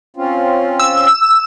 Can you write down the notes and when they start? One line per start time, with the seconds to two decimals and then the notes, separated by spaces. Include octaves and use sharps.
0.17 C4 C#4 F4
0.79 E6